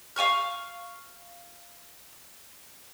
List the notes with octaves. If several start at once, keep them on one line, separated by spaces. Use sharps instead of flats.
F5 G#5 C#6 F6